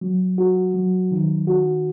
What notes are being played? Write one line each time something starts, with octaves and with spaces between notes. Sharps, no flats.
F#3
F#4
F#3
D#3
F#4